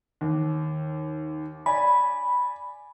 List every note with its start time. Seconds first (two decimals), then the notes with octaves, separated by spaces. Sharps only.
0.21 D#2
1.66 D5 G#5 B5